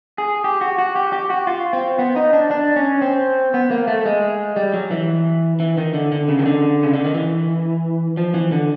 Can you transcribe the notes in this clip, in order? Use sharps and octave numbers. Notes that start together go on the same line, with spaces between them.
G#4
G4
F#4
F#4
G4
G4
F#4
F4
C4
B3
D#4
D4
D4
C#4
C4
B3
A#3
A3
G#3
G3
F#3
E3
E3
D#3
D3
D3
C#3
D#3
D3
C#3
D3
D#3
E3
F3
E3
D3